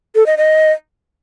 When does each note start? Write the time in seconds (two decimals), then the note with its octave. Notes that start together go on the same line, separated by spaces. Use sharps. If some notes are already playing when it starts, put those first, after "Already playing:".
0.15 A4
0.26 D#5
0.37 D#5